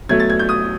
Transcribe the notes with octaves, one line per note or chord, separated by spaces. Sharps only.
B2 F#3 A3 G#6
A6
G#6
G6
D#6